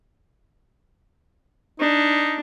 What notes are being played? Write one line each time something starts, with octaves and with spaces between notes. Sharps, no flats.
D4 D#4